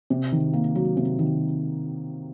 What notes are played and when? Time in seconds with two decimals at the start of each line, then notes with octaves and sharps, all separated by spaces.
0.10 C3
0.32 D#3
0.53 A#3
0.75 F#3
0.97 C3
1.19 D#3